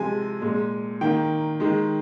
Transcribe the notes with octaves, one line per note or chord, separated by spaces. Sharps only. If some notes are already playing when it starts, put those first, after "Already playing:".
Already playing: C3 F3 G#3 G#5
A#2 G#3
D#3 A#3 G5
D#3 G#3